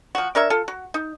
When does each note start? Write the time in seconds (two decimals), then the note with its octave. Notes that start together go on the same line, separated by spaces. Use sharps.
0.15 F3 F#4
0.35 D4 A#4 C#5 E5
0.50 F4 A4
0.68 F#4
0.94 D#4